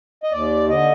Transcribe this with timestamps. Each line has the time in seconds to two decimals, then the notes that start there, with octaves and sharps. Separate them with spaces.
0.23 D#5
0.32 D#2 D5
0.69 D3 D#5